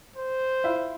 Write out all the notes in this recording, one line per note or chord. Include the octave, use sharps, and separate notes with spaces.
C5
E4 F4